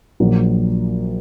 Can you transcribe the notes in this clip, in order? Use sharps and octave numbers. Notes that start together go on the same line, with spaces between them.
A#1 A#2 F#3 A#3